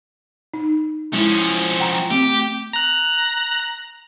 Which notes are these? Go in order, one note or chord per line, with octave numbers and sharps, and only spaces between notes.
D#4
F3 G#3 C#4 E4
F#5 G5 A#5
A3 C4 G4
A#5 F#6